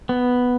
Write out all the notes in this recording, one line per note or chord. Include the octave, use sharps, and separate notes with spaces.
B3